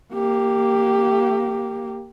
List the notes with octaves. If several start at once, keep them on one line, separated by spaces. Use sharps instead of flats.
A#3 G4